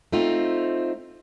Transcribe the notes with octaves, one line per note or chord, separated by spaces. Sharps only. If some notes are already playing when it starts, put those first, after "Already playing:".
A3 C4 D#4 F4